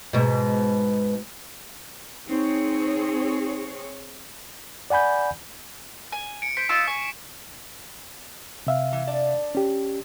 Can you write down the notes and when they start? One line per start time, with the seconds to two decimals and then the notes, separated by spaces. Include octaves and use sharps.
0.13 G#2 B2
2.28 C4 D#4 G#4 C#5
4.90 D5 F#5 G#5 B5 G6
6.12 G#5
6.42 C#7 D7
6.57 C5 B6 D7
6.69 D#4 F4 E6 E7
6.88 G#5 C#6
8.67 C3 E5 F5
8.92 E3
9.07 D4 D5
9.55 C#4 G4